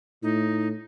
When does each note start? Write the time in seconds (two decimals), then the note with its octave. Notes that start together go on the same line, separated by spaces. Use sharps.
0.23 A2 D#4